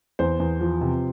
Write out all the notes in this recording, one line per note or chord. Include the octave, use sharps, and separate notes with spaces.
E2 C5
E2
F3
C3